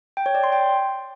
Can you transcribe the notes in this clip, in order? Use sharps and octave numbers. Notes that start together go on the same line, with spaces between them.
G5
C#5
D5
C6
G5